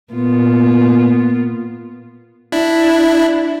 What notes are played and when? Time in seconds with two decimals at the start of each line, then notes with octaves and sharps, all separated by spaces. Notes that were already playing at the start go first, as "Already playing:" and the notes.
0.13 A#2 B3 F4
2.52 D4 E4